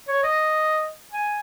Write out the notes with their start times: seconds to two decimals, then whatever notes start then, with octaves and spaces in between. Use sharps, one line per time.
0.09 C#5
0.23 D#5
1.12 G#5